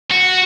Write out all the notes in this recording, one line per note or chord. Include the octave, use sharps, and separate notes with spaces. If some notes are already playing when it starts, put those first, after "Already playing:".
F#4